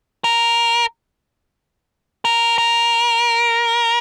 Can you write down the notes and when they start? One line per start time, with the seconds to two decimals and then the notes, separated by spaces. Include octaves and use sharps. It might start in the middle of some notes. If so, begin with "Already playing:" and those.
0.24 A#4
2.25 A#4
2.58 A#4